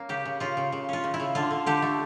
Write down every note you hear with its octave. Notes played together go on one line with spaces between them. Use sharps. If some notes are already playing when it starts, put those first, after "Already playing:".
Already playing: A#3 C#4
C#3 G4
C#3
C#3 F4
C#3
C#3
C#4 F4
C#3
E4
C#3
D3 F4
D3
D3 G4
A3